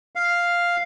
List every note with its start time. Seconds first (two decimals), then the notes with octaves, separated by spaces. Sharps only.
0.15 F5